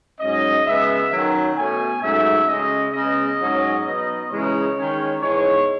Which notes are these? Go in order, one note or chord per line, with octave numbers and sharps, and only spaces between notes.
G#2 F#3 C#4 D#5
C#3 G#3 B3 E5
D#3 F#3 C#4
B2 A3 C#4 G#5
G#2 F#3 A3 C#4 E5
C#3 G#3 C#4 D#5
C#3 G#3 B3 D#5
G#2 F#3 C#4
B2 F#3 B3 D#4
C#3 E3 G#3 D#4 C#5
D#3 G#3 C#4
G#2 E3 G#3 B3 C#5